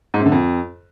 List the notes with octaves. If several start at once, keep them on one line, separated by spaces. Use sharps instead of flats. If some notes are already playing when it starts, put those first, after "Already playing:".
G#2
F#2
D3
F2